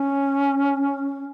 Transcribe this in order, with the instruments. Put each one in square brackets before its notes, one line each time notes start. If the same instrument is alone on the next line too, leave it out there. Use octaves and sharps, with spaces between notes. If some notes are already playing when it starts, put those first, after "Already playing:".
Already playing: [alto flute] C#4